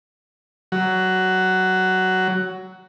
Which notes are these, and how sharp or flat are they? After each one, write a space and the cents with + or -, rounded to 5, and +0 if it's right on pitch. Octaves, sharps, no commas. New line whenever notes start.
F#3 +10